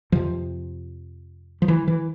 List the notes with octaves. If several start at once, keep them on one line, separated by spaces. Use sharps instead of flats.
F2 C3 F3
F3
E3
E3